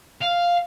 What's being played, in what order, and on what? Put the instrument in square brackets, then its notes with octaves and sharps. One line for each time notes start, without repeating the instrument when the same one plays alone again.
[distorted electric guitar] F5